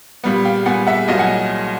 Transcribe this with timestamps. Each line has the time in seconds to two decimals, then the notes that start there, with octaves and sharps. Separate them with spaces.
0.24 A#2 G3 B3
0.45 F5 G5
0.66 A#2 G3 B3 F#5 G#5
0.87 E5 F#5
1.08 C2 A#2 F#3 D#5 F5
1.19 F#5 G#5